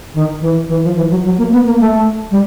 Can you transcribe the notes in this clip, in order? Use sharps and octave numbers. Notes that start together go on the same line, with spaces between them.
D#3
E3
E3
F3
E3
F#3
F#3
A#3
B3
A#3
A3
G3